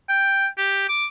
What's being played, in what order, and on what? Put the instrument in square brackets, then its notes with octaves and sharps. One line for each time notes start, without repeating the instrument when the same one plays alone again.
[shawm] G5
G4
D6